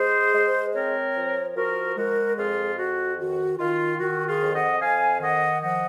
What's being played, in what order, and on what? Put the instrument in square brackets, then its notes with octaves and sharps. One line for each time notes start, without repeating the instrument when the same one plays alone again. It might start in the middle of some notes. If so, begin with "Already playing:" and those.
Already playing: [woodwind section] G#3 G#4 C5
G#3
C4 A#4 C#5
F3
F3 F#4 A#4
G#3 F#4 A#4
F2 F4 G#4
F2 F#4
D#3 F#4
D#3 F4
D#3 F#4
F4 G#4
F2
D#5 F#5
F2 F5 G#5
D#3 D#5 F#5
F3 D#5 F#5